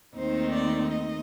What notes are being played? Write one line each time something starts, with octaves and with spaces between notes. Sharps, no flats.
D#2 D#3 A3 C4 D#4 C5
D5
D#5